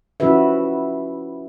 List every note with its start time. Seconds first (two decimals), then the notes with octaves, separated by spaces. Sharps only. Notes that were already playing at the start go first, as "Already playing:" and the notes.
0.20 F3 C#4 E4 F#4 B4 E5